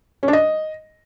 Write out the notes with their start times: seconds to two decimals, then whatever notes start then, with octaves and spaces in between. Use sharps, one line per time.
0.23 C#4
0.28 D4
0.33 D#5